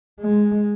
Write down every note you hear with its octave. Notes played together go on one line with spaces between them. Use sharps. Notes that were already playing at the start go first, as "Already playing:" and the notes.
G#3